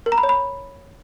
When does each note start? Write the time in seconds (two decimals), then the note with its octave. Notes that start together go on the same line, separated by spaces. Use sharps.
0.06 A#4
0.12 A#5
0.18 B5
0.23 C#5
0.29 B5